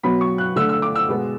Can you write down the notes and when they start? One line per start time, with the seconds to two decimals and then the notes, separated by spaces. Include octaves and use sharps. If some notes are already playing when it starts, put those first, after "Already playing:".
0.03 B2 F#3 B3 B5
0.21 C#6
0.38 F#6
0.56 D3 A3 E6
0.69 E6
0.82 D6
0.95 E6
1.09 B2 G#3 B3